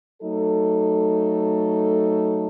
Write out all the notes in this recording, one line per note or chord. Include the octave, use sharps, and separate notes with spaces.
F#3 A3 D#4 A4